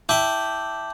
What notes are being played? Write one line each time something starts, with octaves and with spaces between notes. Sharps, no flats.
E4 G5 A5 D6 G6